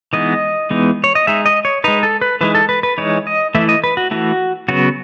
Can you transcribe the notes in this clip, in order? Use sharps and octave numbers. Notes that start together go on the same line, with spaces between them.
E3 G#3 B3 D#4 D#5
E3 G#3 B3 D#4
C#5
D#5
G#3 D#4 E5
D#5
C#5
G#3 D#4 B4
A4
B4
E3 G#3 D#4 B4
A4
B4
B4
E3 G#3 D#4 C#5
D#5
E3 A3 E4 E5
D#5
B4
F#4
E3 A3 E4 F#4
C#3 F#3 B3 F#4